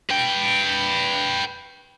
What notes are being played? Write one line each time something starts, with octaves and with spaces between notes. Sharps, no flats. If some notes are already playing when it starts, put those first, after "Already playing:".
B4 G5